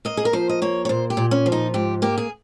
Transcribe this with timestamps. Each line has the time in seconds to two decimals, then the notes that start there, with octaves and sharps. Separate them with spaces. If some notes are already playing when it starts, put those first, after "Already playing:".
0.05 A#3 D#5
0.17 G#4
0.25 A#4
0.33 F3 C5
0.49 D#5
0.62 A#3 C#5
0.85 C#5
0.89 A#2 C5
1.10 G4
1.17 A#2
1.31 C#4
1.46 F3
1.52 D#4
1.74 G#2 G4
2.02 A#3 G4
2.18 G#4